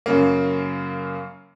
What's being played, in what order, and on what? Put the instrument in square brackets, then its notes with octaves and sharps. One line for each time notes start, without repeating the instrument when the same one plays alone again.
[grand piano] F#2 C#3 A#3